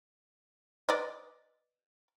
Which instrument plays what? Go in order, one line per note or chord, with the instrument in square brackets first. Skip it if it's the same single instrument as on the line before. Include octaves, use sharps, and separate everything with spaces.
[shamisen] B4 D5 D#5